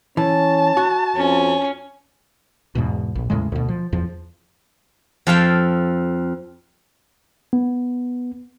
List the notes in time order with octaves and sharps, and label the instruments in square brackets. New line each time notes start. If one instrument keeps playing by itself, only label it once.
[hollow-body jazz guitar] E3 [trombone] C#4 [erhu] A5
[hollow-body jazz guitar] F#4
[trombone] F2 [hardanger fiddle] C#4
[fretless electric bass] E2 G#2 B2
A#1
E2 A2 C#3 G#3
D2 B2
F3
E2 F3
[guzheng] F2 A4 F5 G5 A5
[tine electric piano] B3